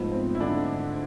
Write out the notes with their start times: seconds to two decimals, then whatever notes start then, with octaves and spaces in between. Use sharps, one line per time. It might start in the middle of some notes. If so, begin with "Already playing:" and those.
Already playing: G#2 F3 A3 B3
0.12 C4
0.35 E4
0.40 D3 D4